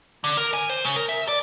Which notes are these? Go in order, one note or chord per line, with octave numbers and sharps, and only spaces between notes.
D3
A#4
G#5
C5
C#3
A#4
E5
D5